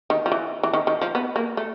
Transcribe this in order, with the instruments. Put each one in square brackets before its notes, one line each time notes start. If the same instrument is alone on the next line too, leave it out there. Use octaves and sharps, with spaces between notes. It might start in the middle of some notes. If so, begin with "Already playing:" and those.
[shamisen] D#3
F3
E3
E3
D#3
D#3
F3
B3
A#3
A3